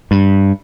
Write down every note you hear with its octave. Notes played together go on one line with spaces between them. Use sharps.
G2